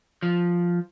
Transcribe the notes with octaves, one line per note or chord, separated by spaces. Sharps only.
F3